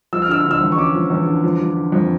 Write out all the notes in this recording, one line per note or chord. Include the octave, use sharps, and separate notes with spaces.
F3 E6
F6
D3 E6
F6
D3
E6
E2
C#6
C#4 D6
F3
E2
D3
F3
F3
D3
F2